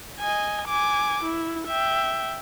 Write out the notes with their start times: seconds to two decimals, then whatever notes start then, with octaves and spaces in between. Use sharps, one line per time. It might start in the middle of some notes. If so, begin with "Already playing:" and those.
0.19 D#5 G#5
0.68 G#5 D6
1.23 E4
1.68 E5 G5